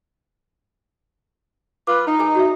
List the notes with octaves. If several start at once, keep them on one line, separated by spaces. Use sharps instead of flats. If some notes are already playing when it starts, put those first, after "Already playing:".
F4 B4 D6
D#4
G#4 A#4 G#5
F#4 C#5 E5